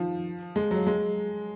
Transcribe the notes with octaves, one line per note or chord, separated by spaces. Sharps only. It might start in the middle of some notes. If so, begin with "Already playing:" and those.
Already playing: D#3 F3
G#3
F#3
G#3